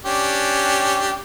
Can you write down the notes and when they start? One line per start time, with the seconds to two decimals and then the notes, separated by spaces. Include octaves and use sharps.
0.05 C#4 D4 G4